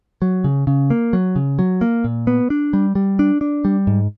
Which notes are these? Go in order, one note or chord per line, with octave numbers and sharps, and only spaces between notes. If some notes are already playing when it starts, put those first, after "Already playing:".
F#3
C#3
C#3
A#3
F#3
C#3
F#3
A#3
A#2
B3
D4
G3
G3
D4
D4
G3
G#2